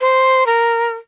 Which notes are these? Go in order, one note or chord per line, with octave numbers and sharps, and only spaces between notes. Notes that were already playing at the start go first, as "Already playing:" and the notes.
C5
A#4